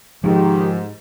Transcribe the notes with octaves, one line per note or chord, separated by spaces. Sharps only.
G#2 D#3 F3 G#3 G4